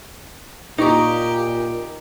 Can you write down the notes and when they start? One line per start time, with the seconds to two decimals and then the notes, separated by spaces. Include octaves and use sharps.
0.78 A#2 D#4 G4 A#5 C#6 D#6